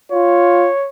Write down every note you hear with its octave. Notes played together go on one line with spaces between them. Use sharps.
F4 C#5